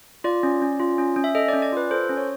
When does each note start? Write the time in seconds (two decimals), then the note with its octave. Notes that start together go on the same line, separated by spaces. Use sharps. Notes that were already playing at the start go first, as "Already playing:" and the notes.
0.24 F4 D5
0.43 C#4
0.62 C#4
0.80 F4
0.98 C#4
1.16 C#4
1.24 E5
1.35 A4 D#5
1.48 D5
1.53 C#4
1.62 D5
1.73 F4 B4
1.91 A4 C5
2.09 C#4
2.17 C#5